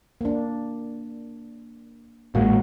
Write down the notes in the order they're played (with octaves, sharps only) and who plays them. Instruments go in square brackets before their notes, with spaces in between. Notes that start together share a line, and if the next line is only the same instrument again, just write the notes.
[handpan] A#3 D4
[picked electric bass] A1 A#2 G#3 [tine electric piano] A#3 [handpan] F#4